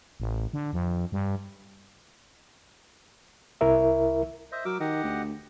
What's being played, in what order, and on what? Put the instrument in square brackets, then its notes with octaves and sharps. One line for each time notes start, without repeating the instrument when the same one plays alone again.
[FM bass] A1
D3
F2
G2
[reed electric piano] C2 E4 A#4 E5
[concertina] C5 D#5 E5
[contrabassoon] F#3 [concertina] A#4 D6 E6
[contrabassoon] D#3 [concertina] G4 D#5 F#5
[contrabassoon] D2